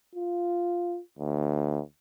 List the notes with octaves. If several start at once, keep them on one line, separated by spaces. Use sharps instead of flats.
F4
D2